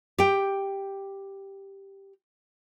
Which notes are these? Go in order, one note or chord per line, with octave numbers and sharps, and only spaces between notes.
G4 G5